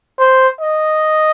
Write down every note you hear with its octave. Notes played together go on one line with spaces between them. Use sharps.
C5
D#5